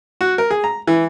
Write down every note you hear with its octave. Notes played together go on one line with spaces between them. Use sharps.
F#4
A#4
G#4
A#5
E3